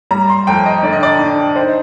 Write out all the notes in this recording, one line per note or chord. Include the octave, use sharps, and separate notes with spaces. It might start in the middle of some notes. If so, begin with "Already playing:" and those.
G3 A#5
C6
F2 G5
D#5
D3 D5
D#5
D5
D4
D#4 C5